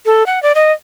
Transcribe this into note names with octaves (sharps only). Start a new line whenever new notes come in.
A4
F#5
D5
D#5